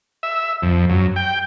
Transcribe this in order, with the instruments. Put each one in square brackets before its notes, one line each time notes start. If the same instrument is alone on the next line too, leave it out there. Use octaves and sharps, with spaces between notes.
[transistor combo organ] E5
F2
F#2
G5